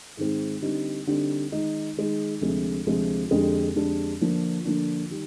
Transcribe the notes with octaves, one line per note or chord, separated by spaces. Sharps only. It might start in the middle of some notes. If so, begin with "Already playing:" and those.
G#2 D#3 G#3 C4
D3 G3 C4 D#4
D3 G3 C4 D#4
D#3 G#3 D#4
D#3 G#3 D#4
D2 C3 F3 G#3
D2 C3 F3 G#3
F2 D3 G#3 D4 G4
F2 D3 G#3 D4 G4
D3 F3 A#3 D4
D3 F3 A#3 D4
D#3 G3